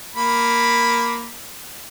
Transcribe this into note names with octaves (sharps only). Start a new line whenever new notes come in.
A#3 B5